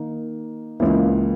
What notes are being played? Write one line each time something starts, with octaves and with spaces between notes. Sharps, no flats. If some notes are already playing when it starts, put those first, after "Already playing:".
Already playing: D#3 A#3 D#4
C#2 C#3 E3 A#3 E4